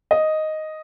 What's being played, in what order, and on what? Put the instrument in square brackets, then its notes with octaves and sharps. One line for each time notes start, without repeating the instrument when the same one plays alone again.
[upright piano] D#5